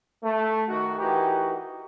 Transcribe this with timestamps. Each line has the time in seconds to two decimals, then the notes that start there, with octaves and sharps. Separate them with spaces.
0.23 A3
0.68 D#3 F#4
0.99 E3 D#4 F#4 G4 A#4